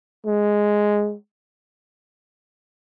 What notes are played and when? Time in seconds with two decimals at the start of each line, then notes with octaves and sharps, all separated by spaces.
0.26 G#3